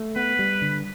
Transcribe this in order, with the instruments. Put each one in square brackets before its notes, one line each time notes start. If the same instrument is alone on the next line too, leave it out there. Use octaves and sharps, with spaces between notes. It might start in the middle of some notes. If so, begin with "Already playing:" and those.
Already playing: [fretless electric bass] A3
[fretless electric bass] B3 [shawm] B4
[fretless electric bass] G3
D3